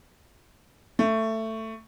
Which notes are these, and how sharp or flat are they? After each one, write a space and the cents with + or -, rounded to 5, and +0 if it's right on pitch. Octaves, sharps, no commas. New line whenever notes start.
A3 +15